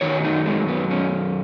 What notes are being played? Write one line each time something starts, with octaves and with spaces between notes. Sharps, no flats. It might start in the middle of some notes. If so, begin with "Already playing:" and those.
F#2 D#3 F#3 C#5
D#4
G#3
B3
C#4